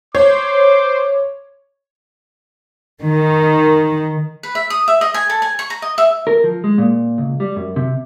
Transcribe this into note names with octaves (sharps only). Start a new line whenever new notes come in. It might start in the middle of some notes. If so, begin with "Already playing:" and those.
C5 C#5 D6
D#3
B4
E5
D#6
E5
D#5
G#5
A4
G#5
C#6
A#5
D#5
E5
A#4
F3
G#3
A#2
C#2
G3
F#2
C3